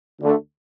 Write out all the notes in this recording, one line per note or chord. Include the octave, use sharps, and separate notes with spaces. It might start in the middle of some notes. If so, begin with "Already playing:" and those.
D2 D3 A3